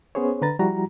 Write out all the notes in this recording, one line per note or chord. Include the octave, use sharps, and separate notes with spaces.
B3 C#4 G#4 C5 C#5
D3 B4 A#5 A6
F3 G3 E4 F#4 A#5